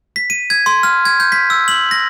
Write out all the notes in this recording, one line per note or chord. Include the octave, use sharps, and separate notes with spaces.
B6
D#7
G#6
C6
F6
G#6
G6
B6
E6
F#7
A#6